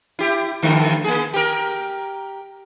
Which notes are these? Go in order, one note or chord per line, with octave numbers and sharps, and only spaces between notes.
E4 G4
G2 D3 A3
A#3 G#4
G4 A#4